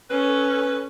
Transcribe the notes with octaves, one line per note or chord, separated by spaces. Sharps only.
C#4 A4 B4